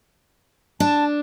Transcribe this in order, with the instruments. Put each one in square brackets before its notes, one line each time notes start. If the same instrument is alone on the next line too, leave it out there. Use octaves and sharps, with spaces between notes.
[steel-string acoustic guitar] D4 [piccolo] A5